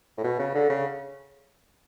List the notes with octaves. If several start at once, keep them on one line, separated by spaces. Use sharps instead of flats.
A2
B2
C#3
D3
C#3